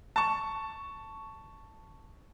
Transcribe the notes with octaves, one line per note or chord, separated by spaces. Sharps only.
A5 C#6